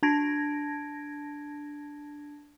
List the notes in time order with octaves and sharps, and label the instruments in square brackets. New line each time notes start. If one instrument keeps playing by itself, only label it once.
[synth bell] D4 A5 G#6 A#6 D7